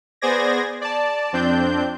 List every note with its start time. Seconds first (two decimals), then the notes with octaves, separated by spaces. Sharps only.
0.21 B3 G#4 C5 D5 G#6 A#6
0.81 D5 A5
1.33 F2 C4 D4 G6